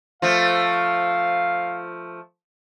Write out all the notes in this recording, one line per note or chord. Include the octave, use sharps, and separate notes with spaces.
F3 A3 F5